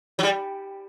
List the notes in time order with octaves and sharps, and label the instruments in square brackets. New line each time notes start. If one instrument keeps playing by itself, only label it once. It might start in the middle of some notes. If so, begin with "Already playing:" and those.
[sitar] F#3
G3